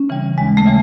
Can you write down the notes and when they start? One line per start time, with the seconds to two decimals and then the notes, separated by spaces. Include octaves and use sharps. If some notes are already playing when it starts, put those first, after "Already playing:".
Already playing: C#4
0.09 C#3 E3 G3
0.38 D#2 G#3
0.57 A3
0.66 C#3 E3 G3